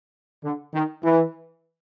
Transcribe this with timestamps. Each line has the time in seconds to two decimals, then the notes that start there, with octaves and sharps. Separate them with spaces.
0.45 D3
0.74 D#3
1.04 E3